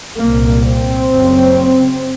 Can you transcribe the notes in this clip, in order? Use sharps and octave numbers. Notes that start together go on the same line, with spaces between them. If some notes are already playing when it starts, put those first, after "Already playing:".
C2 A#2 A#3
C4
F#1 F#2 C#3